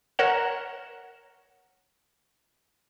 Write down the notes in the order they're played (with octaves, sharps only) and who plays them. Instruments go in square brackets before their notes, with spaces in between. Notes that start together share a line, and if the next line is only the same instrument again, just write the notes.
[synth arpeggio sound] A#4 C#5 F#5 E7